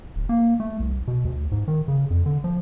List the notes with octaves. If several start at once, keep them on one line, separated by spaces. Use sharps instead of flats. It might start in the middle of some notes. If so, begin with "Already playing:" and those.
D1
A#3
A3
C2
B2
D2
G#2
D#3
C#3
F2
D3
F3